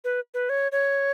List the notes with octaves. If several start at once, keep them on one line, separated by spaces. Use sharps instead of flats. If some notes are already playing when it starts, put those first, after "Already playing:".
B4
B4
C#5
C#5